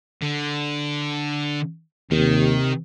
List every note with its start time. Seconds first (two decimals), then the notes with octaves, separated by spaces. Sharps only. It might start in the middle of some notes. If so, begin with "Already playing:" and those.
0.22 D3
2.11 D#2 C3 D#3